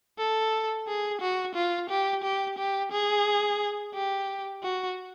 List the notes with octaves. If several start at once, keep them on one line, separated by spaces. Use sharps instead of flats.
A4
G#4
F#4
F4
G4
G4
G4
G#4
G4
F#4